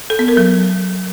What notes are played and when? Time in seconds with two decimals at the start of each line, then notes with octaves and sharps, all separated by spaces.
0.10 A4
0.19 B3
0.28 A#4
0.37 F#3